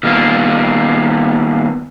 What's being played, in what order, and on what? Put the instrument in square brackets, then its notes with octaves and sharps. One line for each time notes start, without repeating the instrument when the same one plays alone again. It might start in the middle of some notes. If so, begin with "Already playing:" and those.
[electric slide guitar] D#3 G3 A#3 B3 F4